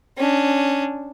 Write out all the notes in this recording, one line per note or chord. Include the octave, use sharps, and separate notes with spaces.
C#4 D4